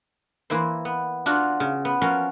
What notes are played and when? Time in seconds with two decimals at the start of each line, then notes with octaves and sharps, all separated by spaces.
0.50 E3 A#3 E4 C5
0.85 B3
1.26 D4 F4 F#4
1.60 C#3
1.85 B3
2.01 F3 C#4 F#4 A#4 F5